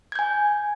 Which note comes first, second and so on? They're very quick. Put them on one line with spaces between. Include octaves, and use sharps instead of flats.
G#6 G6 G#5